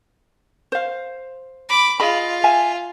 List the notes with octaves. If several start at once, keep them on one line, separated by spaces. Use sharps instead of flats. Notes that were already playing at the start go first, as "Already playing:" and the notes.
C5 F5
B5 D6
F4 G#4 D#5 B5
E5 F5 G#5